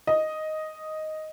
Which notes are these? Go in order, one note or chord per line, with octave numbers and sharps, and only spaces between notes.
D#5